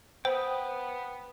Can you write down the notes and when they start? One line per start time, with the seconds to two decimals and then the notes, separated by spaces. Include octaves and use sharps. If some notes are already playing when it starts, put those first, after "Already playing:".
0.25 B3 C5 G5 B5 D#6